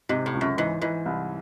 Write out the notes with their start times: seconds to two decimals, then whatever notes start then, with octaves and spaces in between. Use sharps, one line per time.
0.09 G#2 C3
0.26 A2
0.34 C#2
0.41 F#2
0.58 G#2 E3
0.81 G#2 E3
1.06 C2